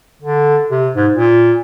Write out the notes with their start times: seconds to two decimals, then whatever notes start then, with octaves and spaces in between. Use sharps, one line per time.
0.22 D3
0.70 C3
0.95 G#2
1.14 A#2